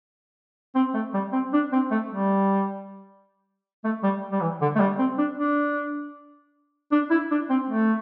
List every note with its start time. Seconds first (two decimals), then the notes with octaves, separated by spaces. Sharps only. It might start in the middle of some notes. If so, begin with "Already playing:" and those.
0.75 C4
0.94 A3
1.13 G3
1.33 C4
1.53 D4
1.72 C4
1.91 A3
2.11 G3
3.84 A3
4.03 G3
4.32 G3
4.41 E3
4.61 D3
4.76 A3
4.80 G3
4.99 C4
5.18 D4
5.37 D4
6.92 D4
7.10 E4
7.31 D4
7.50 C4
7.69 A3